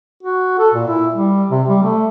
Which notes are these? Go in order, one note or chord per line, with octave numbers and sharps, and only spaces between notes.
F#4
A4
A#2
E4
G3
C3
G3
A3